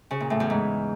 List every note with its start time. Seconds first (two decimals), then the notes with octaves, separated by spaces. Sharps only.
0.11 C#3
0.20 A#2
0.30 A2
0.40 E2
0.50 G#2